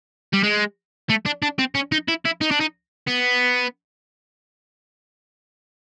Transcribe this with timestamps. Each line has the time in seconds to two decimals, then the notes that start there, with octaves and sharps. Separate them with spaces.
0.33 G3
0.44 G#3
1.10 A3
1.26 D4
1.42 D4
1.59 C4
1.75 C#4
1.92 D#4
2.08 E4
2.25 E4
2.41 D#4
2.51 D4
2.60 D#4
3.07 B3